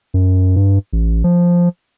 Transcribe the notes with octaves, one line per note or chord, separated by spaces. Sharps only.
F#2
G2
A1
F3